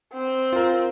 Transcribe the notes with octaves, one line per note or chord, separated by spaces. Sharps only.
C4
F4 A#4